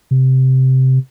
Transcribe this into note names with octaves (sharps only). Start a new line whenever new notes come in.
C3